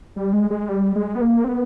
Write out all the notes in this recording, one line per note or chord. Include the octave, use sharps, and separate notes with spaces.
G3
G#3
G#3
G3
G#3
B3
A#3
C4
B3